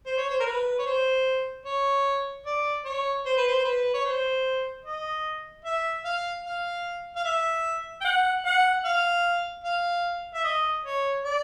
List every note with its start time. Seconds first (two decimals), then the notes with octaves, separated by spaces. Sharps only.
0.06 C5
0.17 C#5
0.30 C5
0.40 A#4
0.46 B4
0.79 C#5
0.86 C5
1.65 C#5
2.46 D5
2.85 C#5
3.26 C5
3.37 B4
3.48 C5
3.58 C5
3.65 B4
3.94 C#5
4.05 C5
4.85 D#5
5.65 E5
6.05 F5
6.45 F5
7.16 F5
7.25 E5
8.01 G5
8.04 F#5
8.45 F#5
8.85 F5
9.64 F5
10.34 E5
10.44 D#5
10.84 C#5
11.24 D5